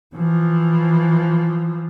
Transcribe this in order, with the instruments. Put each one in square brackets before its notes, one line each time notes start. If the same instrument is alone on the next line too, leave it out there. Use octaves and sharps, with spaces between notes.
[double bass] E3 F3